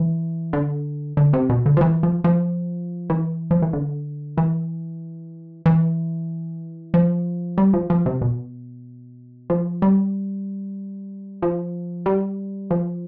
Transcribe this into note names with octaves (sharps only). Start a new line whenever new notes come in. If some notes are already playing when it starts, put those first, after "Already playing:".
Already playing: E3
D3
D3
C3
B2
D3
F3
E3
F3
F3
E3
F3
E3
D3
E3
E3
F3
G3
F3
F3
C3
B2
F3
G3
F3
G3
F3